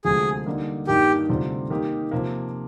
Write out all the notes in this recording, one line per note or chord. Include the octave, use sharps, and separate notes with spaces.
D2 C3 F3 G#3 G#4
D3 G3 A#3 D#4
G2 D#3 A#3 D#4 G4
D2 C3 G3 C4 F4
D#3 A#3 D#4 G4
C3 F3 A#3